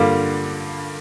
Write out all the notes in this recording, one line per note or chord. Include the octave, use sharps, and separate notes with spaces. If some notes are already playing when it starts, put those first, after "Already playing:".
Already playing: G2 D3 G3 A#3 F4